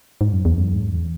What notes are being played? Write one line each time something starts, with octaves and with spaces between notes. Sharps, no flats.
G#2
F#2
E2
F#2
G#2
E2